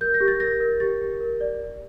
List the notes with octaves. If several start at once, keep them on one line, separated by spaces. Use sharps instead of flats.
A#4 G6
A#6
G4
A6
A#4 A#6
A#4
G4 A6
G4
A#4
D5
D5